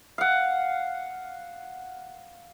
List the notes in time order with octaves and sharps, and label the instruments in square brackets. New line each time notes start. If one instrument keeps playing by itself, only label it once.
[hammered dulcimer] F5 F#5